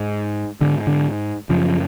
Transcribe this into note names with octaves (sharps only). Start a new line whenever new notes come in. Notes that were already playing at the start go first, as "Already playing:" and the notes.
Already playing: G#2
G#2 D3
D3
F#2 C#3 F3